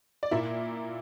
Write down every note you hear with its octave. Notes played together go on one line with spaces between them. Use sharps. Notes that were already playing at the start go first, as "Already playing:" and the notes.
D5
A#2 A#3 E4 E5